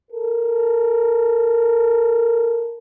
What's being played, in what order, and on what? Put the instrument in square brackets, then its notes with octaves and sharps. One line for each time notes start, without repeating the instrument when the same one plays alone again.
[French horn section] A4 A#4